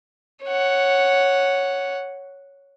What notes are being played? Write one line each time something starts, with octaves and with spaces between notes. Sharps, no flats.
C#5 F#5